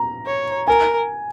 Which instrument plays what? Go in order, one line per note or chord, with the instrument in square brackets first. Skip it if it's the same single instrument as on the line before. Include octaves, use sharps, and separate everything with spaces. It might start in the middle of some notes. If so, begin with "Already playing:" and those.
Already playing: [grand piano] A#5
[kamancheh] C#5
[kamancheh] A#4 [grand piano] G#5